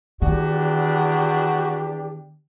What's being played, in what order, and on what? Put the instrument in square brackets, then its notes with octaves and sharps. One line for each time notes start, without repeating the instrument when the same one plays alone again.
[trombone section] E2 D4 G4 [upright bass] D#3 [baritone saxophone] F#4